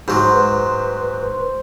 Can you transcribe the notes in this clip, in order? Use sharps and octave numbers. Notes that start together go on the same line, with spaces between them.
G#2 F#3 C5
B4